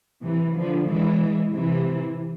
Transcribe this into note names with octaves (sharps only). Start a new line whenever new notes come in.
C3 E3
D3 F3
E3 G#3
C3 E3